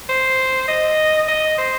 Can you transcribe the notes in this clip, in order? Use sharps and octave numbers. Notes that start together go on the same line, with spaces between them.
C5
D#5
D#5
C5